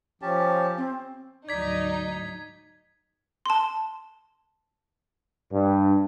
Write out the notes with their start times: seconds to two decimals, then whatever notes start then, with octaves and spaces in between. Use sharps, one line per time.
0.22 F3 C#4 G4 A5
0.77 C4
1.49 D2 G#2 F#3 D#4 D5 G#6 B6
3.46 A5 C6
5.51 G2